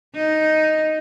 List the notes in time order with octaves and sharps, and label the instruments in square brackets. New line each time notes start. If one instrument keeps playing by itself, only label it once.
[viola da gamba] D#4